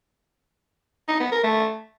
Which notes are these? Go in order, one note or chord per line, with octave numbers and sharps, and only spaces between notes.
D#4
B3
A#4
A3